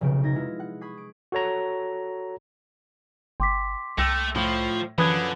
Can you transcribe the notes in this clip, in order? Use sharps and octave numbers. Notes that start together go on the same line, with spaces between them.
F1 B1 C#3 G6 D7
D#4 G#6 A#6
G#3 E4 F4
F#5
B5 C#6 D#6 G#6 C7
D7
F#4 A4 C#5 A#5
G1 G5 C6 D6 B6
C2 A3 G5 E6 A#6
A2 F3
F#2 D3 E3 F3 B4 B5 D#6 G#6